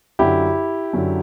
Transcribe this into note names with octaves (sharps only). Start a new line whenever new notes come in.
F#2 D3 F#3 E4 G4
F#2 D3 F#3